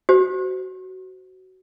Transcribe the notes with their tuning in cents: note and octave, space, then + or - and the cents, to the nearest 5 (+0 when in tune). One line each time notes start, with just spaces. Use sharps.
F#4 +15 C5 -25